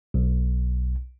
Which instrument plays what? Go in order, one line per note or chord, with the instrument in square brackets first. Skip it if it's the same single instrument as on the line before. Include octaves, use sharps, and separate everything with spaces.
[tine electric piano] B1